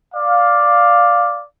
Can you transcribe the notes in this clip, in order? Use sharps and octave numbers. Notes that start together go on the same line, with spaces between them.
D5 F5